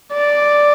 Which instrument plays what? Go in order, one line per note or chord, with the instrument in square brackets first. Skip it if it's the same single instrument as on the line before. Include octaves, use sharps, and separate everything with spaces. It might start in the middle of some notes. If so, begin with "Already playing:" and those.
[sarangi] D5